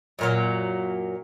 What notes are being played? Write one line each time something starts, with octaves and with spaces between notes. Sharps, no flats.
F#2 A#2 F#3